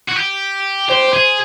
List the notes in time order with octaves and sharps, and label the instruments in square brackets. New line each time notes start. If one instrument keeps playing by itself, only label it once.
[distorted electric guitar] F#4
G4
[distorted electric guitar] G4 [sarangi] C5
[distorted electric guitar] G#4